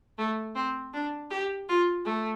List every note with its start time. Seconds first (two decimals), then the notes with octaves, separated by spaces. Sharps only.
0.18 A3
0.55 C4
0.93 D4
1.30 G4
1.69 F4
2.05 A3